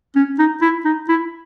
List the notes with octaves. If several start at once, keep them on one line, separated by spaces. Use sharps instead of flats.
C#4
D#4
E4
D#4
E4